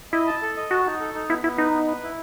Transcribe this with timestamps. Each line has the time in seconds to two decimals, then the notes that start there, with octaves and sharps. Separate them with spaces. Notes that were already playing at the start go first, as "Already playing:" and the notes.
0.12 E4 D#5
0.27 A5
0.42 A4
0.57 D#5
0.70 F#4 A5
0.86 D#4
1.00 A4
1.14 D#4
1.29 B3 E4
1.44 B3 E4
1.58 D#4 B4
1.74 B3
1.87 B4
2.03 E4